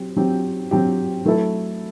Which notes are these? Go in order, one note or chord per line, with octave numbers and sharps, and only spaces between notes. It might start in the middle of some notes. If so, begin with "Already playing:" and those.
Already playing: F#3 C4 G4
F#3 C4 G4
F#3 C4 G4
F#3 A3 E4 A4